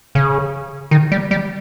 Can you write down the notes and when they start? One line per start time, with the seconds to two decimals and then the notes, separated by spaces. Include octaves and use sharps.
0.15 C#3
0.91 D#3
1.12 G3
1.31 G3